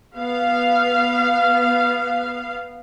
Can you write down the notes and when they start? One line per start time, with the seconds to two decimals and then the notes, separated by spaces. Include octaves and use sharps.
0.17 B3 F5